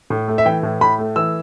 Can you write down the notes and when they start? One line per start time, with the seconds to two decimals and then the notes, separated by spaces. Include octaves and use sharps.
0.10 A2
0.28 A3
0.38 E5
0.45 E3 G5
0.63 A2
0.81 A2 B5
0.99 A3
1.16 E3 E6